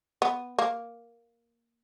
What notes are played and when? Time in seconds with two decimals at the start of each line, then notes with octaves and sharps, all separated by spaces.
0.22 B3
0.59 A#3